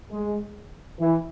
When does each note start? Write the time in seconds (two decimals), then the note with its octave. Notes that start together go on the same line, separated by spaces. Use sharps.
0.11 G#3
1.00 E3